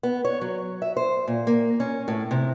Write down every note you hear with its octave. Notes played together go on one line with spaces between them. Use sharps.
B3
C#5
F#3
E5
C5
A#2
A#3
C#4
A2
C3